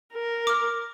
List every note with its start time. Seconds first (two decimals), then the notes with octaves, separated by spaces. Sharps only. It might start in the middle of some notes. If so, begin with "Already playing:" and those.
0.13 A#4
0.47 D6 F6